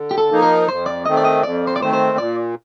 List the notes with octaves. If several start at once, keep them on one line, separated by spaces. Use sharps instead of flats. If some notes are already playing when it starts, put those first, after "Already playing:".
Already playing: D3
G4
A4
F3 A#3 D#4
A#4
F2 C5
D5
D#3 A3 C4 D#5
D5
D#5
F2 D5
C5
D5
D#3 A3 C4 C5
C5
A#2 D5